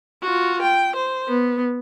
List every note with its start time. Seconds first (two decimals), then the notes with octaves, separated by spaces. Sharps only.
0.23 F4 F#4
0.62 G5
0.96 C5
1.28 B3